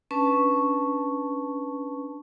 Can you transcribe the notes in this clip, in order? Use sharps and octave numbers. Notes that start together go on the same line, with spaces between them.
C#4 D4 B4 A5 C#6